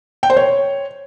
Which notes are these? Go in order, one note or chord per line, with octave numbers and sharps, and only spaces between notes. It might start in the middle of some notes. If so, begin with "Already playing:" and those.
G5
C5
C#5